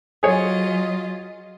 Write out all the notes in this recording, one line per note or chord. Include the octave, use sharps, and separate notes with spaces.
F#3 F4 G#4 C#5 D#5